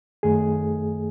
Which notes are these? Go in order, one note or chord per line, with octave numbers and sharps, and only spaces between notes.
F#2 D#3 A3 G#4